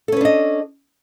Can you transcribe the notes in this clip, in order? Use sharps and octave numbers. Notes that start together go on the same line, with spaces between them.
C#4 D4 A4 B4 D#5